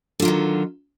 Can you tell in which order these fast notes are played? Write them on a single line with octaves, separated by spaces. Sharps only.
D3 F4 F#3 D#3